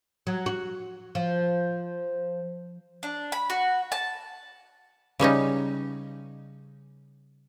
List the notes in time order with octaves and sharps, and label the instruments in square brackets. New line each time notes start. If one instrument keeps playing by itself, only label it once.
[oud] F#3
F#4
F3
[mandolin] D4
B5
F#4
A5
[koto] C#3 G3 C#4 D#4